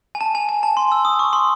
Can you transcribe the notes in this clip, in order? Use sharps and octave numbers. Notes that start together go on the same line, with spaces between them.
G#5
A5
G#5
G#5
A5
C6
E6
D#6
C#6
C6